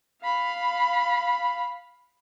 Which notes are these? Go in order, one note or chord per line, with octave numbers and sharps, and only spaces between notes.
F5 B5